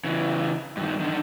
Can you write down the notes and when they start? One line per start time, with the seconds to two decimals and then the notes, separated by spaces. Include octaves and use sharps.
0.04 C#3 E3
0.77 G2 D#3
1.00 D3 D#3